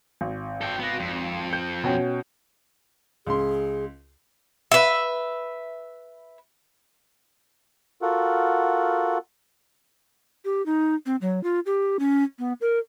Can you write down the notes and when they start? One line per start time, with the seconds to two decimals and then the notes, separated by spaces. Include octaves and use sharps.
0.21 G#1
0.61 A4 G5
0.80 B3 F#4
1.00 F2
1.53 G6
1.84 B2 C#4 G5
3.27 C#2 G#4 C6
4.71 B4 E5
8.02 F4 F#4 A4 A#4 F#5
10.45 G4
10.66 D#4
11.06 C4
11.21 F#3
11.44 F4
11.66 G4
11.99 C#4
12.39 B3
12.61 A#4